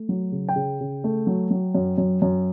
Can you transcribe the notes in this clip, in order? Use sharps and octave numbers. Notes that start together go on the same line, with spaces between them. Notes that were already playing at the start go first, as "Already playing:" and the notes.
Already playing: A3
F#3
C#3
G5
C#3
C#3
A3
F#3
F#3
F#2
F#2
F#2